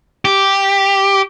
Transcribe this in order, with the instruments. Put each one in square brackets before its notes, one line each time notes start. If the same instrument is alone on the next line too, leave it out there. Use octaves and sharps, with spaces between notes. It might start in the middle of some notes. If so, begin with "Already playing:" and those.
[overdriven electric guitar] G4